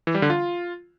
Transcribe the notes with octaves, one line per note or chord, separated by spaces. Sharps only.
E3
G3
D3
F4